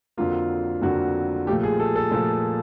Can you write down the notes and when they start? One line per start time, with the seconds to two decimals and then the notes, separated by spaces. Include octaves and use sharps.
0.17 F2 D3 F#3 A#3 F4
0.82 F2 D3 F#3 A#3 F#4
1.47 A#2 F3 A3 G4
1.63 G#4
1.80 A4
1.96 A4
2.11 A#2 F3 A3 A4